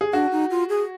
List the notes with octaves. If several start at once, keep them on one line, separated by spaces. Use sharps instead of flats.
G#4
D4 F#4
D#4
F4
G#4